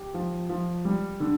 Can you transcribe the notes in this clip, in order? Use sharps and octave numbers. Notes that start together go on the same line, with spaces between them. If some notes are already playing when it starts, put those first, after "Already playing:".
Already playing: G4
F3
F3
G3
D3